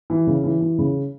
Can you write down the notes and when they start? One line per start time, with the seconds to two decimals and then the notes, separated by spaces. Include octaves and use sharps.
0.10 E3
0.27 C#3
0.44 E3
0.61 E3
0.78 C#3